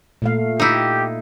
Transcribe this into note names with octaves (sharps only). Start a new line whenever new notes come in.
A#2 A3 F5
D#4 E4 G4